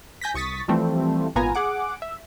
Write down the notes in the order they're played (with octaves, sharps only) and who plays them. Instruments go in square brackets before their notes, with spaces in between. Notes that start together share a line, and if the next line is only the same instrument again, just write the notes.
[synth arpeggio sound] G#5 G6 A#6 B6
C2 C#6 D#6 A6 B6
E3 F3 G3 A3 C4
G#1 A#2 B3 F4 G#5 A#5
G#4 F#5 D6
E5